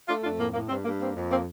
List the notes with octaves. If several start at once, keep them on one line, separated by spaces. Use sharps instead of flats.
A3 D4 F4
F2 D4 F4
A2 A#3
A2 A#3
G2 C4
G2 A#3
A#3 C4
F2
A#3 C4